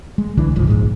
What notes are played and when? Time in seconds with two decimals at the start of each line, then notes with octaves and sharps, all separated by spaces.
0.18 G#3
0.37 C2 D3 E3 D4
0.56 G1 C#2 G#2 F3
0.68 D#1 A#1 G#2 G#3